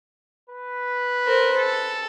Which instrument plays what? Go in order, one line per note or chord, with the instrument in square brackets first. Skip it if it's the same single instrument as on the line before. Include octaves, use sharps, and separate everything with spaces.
[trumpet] B4
[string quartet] A#4 C5
A4